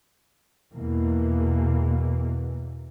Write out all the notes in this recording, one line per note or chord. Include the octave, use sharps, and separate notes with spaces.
E2 B2 E3 A#3